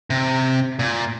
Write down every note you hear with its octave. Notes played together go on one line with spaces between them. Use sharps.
C3
A#2